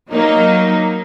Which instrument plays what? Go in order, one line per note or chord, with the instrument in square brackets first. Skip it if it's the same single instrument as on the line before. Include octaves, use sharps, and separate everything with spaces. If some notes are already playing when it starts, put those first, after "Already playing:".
[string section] F#3 A#3 D#4